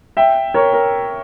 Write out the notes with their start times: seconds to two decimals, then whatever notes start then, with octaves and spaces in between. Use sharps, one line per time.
0.17 E5 G5
0.54 A#4 C#5
0.73 A#4